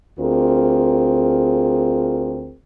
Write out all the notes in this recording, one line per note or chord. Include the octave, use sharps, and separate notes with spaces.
D2 C4 F4 G#4 A#4